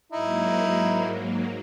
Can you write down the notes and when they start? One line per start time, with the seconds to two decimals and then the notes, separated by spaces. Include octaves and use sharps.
0.12 G#2 F#3 A#3 D#4 E4